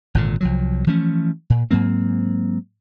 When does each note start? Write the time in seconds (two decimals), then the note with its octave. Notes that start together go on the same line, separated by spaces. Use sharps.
0.15 G#1 A#2 D3
0.41 C2 F3 F#3
0.87 E3 F3 A3 C#4
1.50 A#2
1.71 G#2 F#3 A#3 C4